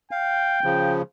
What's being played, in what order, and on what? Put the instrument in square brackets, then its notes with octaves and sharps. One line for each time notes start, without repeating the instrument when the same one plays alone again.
[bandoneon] F5 [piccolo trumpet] G5
[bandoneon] C#3 F3